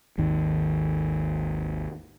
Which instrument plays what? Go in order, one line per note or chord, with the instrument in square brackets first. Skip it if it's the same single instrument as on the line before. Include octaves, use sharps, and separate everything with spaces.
[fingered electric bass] G#1 D#2 D#3